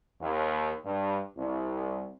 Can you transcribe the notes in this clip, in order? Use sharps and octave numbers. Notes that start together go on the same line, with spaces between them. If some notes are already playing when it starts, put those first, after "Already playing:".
D#2
G2
C2